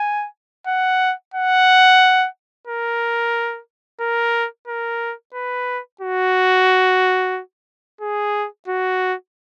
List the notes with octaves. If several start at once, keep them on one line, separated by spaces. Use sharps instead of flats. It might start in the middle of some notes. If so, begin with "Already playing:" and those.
Already playing: G#5
F#5
F#5
A#4
A#4
A#4
B4
F#4
G#4
F#4